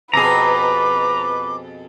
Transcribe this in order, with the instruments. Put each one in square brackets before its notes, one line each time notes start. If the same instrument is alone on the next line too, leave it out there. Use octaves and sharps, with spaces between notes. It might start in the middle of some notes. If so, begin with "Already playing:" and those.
[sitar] F2 B2 G#4 [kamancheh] B4 [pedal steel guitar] A#5 [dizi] D6